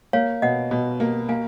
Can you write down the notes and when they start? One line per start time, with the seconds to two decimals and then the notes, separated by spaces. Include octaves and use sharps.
0.13 A#3 C#5 F5
0.42 B2 D#5 F#5
0.71 B2
1.00 A#3
1.29 A#3 F5 G#5